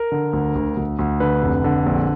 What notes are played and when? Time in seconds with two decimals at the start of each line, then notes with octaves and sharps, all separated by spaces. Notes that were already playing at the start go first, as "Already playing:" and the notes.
Already playing: A#4
0.12 D3
0.33 D2
0.55 D2
0.77 D2
0.99 D2
1.20 D3 B4
1.43 F1
1.64 D3
1.86 A#1